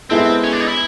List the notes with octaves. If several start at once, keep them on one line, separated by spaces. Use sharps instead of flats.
G#3 B3 C4 E4 A4
C#4
D4
D#4
E4